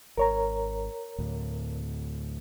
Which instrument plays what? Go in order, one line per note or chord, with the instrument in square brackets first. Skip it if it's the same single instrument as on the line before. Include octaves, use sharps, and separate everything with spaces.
[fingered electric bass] G#1 [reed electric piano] A#4 C#5 A#5
[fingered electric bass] D2 A2